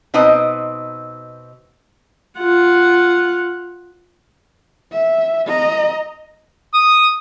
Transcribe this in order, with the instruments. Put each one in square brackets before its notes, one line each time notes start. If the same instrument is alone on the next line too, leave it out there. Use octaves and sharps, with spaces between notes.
[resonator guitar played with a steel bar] B2 C4 D#4 B4 D#5 A#5
[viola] F4 F#5
[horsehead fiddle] E5
D#5 A#5
[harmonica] D#6